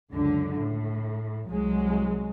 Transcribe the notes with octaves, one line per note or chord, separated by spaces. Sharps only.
C#2 F#2 D3
A2
C2 F#3 G#3